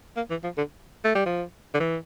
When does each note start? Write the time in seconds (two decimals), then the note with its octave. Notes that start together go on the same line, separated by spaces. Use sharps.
0.17 A#3
0.30 E3
0.44 F3
0.57 D3
1.05 A3
1.15 G3
1.26 F3
1.74 D3
1.80 E3